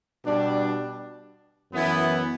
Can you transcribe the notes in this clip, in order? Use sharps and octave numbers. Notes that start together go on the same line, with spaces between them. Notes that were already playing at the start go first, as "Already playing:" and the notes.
B2 G3 D4
F#2 E3 B3 E4